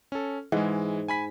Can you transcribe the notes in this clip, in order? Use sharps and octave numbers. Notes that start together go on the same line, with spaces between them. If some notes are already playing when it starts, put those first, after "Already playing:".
C#4 A4
G#2 E3 G#3
G#5 B5 B6